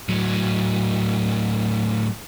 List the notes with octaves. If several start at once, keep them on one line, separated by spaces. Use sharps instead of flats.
A2 F#3